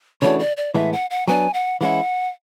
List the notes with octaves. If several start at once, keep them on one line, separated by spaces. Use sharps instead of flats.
C#3 E3 A3 D4 F#4 C#5
D5
D5
A2 E3 G#3 B3 E5
F#5
F#5
F#3 B3 D4 G#5
F#5
E3 G#3 C#4 E4 F#5